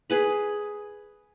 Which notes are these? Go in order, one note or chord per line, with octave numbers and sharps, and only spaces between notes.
G#4 B4 B5